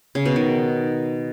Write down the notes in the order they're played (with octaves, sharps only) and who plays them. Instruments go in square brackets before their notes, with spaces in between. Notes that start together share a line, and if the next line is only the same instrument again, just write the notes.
[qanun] C#3
B2
D#3